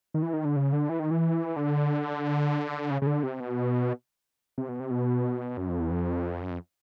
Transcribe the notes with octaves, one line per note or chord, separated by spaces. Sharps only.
D#3
E3
D#3
D3
C#3
D3
E3
D#3
E3
D3
C#3
C#3
D3
C3
B2
C3
B2
C3
B2
F#2
F2
E2
F2
F#2
F2